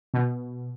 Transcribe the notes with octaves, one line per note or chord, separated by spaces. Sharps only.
B2